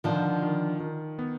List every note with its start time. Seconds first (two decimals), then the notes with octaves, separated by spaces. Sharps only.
0.04 D3 D#3 F3
0.42 D#3
0.80 D#3
1.19 B3